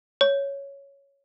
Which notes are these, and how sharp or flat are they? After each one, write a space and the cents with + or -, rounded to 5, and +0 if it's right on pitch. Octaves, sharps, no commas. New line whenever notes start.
C#5 +5